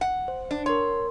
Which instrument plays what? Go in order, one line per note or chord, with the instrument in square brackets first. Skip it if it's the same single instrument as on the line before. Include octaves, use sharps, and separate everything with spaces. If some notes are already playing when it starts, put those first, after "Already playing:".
[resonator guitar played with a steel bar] F#5
[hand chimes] C5
[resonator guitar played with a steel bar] D4
[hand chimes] A#4 C6 [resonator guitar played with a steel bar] C#5